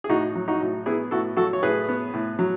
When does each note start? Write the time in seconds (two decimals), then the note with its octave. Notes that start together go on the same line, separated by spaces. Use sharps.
0.04 G#4
0.09 A2 D#4 F#4
0.35 F#3
0.48 D#4 F#4
0.61 A2
0.86 B3 E4 G#4
1.11 A2 F#4 A4
1.37 F#3 F#4 A4
1.53 C#5
1.63 A2 G#4 B4
1.89 B3
2.14 A2
2.39 F#3